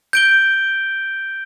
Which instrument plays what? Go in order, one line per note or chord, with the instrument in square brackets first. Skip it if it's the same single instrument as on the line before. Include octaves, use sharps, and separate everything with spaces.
[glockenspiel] G6 D7 G7